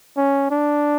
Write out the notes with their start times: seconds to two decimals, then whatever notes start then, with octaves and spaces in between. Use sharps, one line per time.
0.17 C#4
0.51 D4